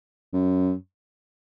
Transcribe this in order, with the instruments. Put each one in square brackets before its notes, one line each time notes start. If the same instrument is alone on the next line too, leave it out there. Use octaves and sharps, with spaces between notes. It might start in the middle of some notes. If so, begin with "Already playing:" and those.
[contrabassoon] F#2